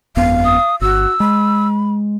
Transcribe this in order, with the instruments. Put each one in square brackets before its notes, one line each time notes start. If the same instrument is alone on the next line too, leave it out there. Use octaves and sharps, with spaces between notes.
[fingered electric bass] G1 F2 B3 [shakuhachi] F5
[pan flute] D#6
[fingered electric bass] G1 [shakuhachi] F#4 [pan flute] E6
[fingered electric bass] G#3 [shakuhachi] B5